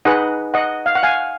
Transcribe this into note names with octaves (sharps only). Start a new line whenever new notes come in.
D#4 G#4 B4 D#5 F#5
D#5 F#5
F5
F#5
F5 G#5